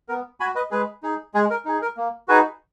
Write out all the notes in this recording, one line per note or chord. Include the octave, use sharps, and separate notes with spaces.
B3 A#4
F#4 G#5 B5
B4 D#5
G#3 G#4 B4
D#4 G#4
G#3 G#4
A#4
D#4 G#4
A#4
A#3
D#4 F#4 G#4 B4